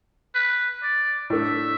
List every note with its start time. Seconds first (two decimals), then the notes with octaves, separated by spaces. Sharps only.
0.35 B4
0.83 D5
1.30 A2 A3 D4 E5